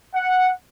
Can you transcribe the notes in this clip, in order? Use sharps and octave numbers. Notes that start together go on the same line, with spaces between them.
F#5